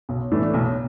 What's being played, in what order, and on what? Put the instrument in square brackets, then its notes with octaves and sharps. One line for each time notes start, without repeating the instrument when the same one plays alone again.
[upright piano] B1
A2 E3 A3 D4
B1